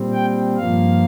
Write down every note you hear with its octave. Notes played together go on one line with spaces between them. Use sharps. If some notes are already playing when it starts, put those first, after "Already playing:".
Already playing: A#2 G3 C4
G5
G2 F3 A#3 F5